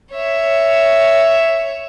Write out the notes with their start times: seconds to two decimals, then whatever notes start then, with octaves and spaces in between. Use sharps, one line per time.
0.13 C#5 E5